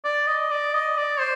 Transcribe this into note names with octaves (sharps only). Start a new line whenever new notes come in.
D5
D#5
D5
D#5
D5
C5